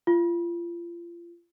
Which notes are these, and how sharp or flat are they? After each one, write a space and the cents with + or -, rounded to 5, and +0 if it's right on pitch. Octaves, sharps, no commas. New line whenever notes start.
F4 -30